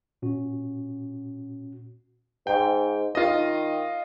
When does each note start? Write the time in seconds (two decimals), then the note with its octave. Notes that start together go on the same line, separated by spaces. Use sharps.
0.22 A#2 C#4 F#4
2.47 G#2 G5
3.15 D#3 F4 D#5